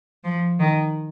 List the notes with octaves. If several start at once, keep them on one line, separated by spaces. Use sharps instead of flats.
F3
D#3